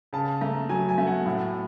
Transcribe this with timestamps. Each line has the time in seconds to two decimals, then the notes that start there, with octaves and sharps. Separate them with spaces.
0.13 C#3 A5
0.41 A3 A#5
0.69 F#3 G#5
0.89 G#5
0.98 A3
1.07 F#5
1.26 A2